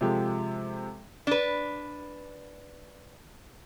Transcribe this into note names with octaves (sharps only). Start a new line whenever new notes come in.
C3 F3 G#3 G4 A4
D4 B4